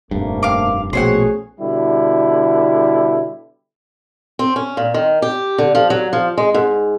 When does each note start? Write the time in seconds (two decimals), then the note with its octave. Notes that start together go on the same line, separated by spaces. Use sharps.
0.11 F1 A#1 G2 A3 A#3
0.43 F5 D6
0.93 A#1 B2 A3 C#4 G#4 C5 C#5 F#5
1.60 B2 D3 G3 E4
4.39 C4
4.56 C#4
4.77 A#2
4.94 D#3
5.22 G4
5.58 D3
5.75 F3
5.90 F#3
6.13 F3
6.38 G#3
6.54 G#2